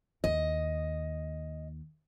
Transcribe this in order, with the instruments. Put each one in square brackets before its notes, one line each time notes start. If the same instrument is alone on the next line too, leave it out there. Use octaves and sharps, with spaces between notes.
[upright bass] D#2 [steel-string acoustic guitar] D#5